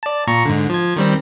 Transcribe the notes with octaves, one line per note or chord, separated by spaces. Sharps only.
D5 A5
A#2 A#5 C#6
G#2 D3
F3 G#6
D#3 G3 C4